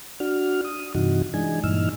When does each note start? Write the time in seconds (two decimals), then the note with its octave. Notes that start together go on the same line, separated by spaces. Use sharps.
0.20 D4 F#4 F6
0.65 D#6
0.95 G2 C3 E3 D#4 F#4
1.34 E3 G#3 D4 D#4 G#5
1.64 G2 A#2 E3 D#4 E6 F6